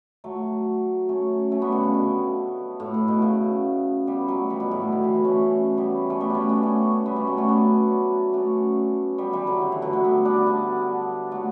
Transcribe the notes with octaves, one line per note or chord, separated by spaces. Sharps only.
F#3 A3
A3 C#4
A3 C#4
G3 B3
D3
C#3
B2
A2
A2
B2
C#3
G3 B3
F#3 A3
E3 G3
B2
A2
B2
D3
E3
E3
A3 C#4
G3 B3
A3 C#4
G3 B3
A3 C#4 D4
B3 D4
A3 C#4
G3 B3
A3 C#4
F#3 A3
A3 C#4
B3 D4
A3 C#4
G3 B3
E3 G3
D3 F#3
E3
E3
D3 F#3
F#3 A3
G3 B3
B3 D4
B3 D4
F#3 A3